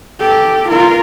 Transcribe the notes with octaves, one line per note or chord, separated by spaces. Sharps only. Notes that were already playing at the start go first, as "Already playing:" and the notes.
G4 A4
F4 A#4